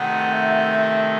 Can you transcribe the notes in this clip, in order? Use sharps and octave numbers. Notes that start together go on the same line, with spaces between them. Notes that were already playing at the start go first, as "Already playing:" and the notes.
Already playing: C3 D#3 A3 D#4 F#5
E5